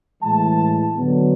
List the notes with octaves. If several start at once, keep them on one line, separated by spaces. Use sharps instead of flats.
A2 E3 G#3 A5
D3 F#3 B3